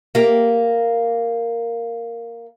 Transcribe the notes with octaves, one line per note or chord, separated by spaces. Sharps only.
A#3 G4